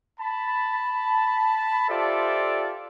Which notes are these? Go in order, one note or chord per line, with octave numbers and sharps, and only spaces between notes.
A5 B5
F4 G4 A4 C5 D5 E5